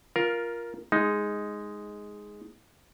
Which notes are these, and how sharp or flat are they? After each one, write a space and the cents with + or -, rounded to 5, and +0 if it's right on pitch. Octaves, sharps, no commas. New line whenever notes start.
F4 +0 A#4 +10
G#3 +0 D#4 +5